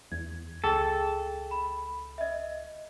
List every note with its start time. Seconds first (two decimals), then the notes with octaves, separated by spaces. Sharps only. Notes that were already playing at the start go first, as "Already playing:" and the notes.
0.12 E2 G#6
0.64 C#2 G#4 A4 G5
1.51 B5
2.18 D#5 E5